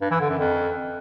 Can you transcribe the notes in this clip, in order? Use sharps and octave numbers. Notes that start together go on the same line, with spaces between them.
G2
E3
D3
F#2
F2